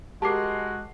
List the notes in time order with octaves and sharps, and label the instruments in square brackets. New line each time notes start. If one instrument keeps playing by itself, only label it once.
[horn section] G#3 [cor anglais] F#4 [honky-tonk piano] G4 A#4 C7 [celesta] A5 D6